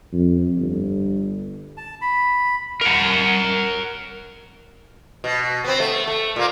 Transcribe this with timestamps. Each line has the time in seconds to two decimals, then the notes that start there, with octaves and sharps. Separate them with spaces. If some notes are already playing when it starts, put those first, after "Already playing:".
0.12 F2
0.57 G1
1.77 A5
2.01 B5
2.81 A#4 F#5
5.24 B2
5.64 B3 C4
5.80 A3
6.07 A3
6.36 A#2 A#3